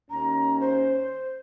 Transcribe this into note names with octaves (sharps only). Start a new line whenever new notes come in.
D#2 C#4 A#5
C5